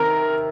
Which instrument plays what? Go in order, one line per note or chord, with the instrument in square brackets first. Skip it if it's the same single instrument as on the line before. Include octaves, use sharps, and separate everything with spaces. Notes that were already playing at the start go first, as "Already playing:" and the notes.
Already playing: [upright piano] C3 D#3 [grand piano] A#4